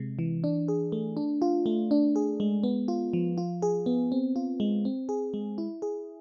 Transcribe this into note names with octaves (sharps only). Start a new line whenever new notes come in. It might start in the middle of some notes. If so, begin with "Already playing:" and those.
Already playing: C3 G#3
E3
D4
G#4
A3
D4
F4
A3
D4
G#4
G#3
B3
F4
F3
F4
G#4
B3
C4
F4
G#3
C4
G#4
G#3
E4
G#4